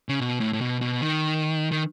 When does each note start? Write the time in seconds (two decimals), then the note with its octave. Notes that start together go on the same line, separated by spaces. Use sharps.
0.09 C#3
0.20 B2
0.40 A2
0.53 A2
0.61 B2
0.81 B2
1.02 D#3
1.71 D#3